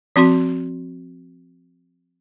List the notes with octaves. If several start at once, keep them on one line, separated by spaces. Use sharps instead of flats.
F3 C4 F#4 C6